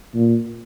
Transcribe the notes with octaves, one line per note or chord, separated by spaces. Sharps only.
A#2